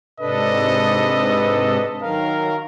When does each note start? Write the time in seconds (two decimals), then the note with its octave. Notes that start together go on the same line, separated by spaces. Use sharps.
0.20 G#2 C3 D4 A4 B4 D#5
2.02 D#3 F#3 A#4 F5